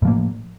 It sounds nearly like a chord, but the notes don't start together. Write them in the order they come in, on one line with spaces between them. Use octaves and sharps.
A2 F3 A#3